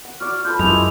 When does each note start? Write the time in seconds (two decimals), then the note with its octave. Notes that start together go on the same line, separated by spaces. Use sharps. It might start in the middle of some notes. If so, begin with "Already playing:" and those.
0.05 F#5
0.20 F#4 D5 F6
0.45 F4 A4 B4 G6
0.59 F#2 G#3 E4 F7